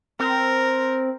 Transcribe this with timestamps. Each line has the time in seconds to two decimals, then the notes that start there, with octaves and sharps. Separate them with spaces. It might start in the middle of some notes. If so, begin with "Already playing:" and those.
0.20 C4 A#4